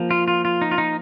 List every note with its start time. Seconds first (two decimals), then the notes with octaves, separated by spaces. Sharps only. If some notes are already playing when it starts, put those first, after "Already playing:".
Already playing: F3 A#3
0.11 F4
0.28 F4
0.45 F4
0.62 D#4
0.71 F4
0.78 D#4